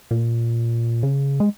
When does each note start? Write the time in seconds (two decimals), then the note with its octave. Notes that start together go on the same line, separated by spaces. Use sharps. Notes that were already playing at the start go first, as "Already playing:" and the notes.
0.11 A#2
1.03 C#3
1.40 G#3